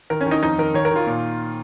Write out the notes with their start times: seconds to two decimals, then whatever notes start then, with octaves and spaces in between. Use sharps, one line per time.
0.10 D#3 A#4
0.21 C#4
0.26 D#3
0.31 D#4
0.43 F2 D#4
0.58 D#3 A#4
0.74 D#3 C#5
0.85 A#4
0.91 D#3 F4
1.07 A#2